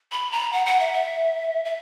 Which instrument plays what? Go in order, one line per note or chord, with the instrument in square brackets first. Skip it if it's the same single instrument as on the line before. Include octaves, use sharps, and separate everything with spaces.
[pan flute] B5
A#5
F#5
F#5
E5
E5
E5